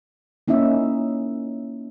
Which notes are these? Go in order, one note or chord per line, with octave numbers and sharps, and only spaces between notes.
A#3 C#4 D#4 E4 E5